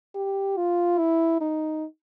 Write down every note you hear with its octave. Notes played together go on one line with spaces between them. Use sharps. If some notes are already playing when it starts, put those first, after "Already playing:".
G4
F4
E4
D#4